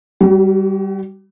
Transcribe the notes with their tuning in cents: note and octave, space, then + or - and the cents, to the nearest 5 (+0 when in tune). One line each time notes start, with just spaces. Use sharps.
G3 -5 F#4 +40